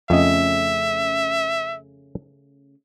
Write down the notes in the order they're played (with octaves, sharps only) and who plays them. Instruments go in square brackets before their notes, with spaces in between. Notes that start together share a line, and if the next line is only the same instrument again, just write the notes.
[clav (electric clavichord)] F2 D#5 [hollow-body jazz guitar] C#3 A3 C#4 [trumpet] E5